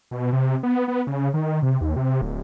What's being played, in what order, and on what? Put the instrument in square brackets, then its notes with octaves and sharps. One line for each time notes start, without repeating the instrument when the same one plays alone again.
[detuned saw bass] B2
C3
B3
B3
C#3
D#3
C3
D#2
C3
D1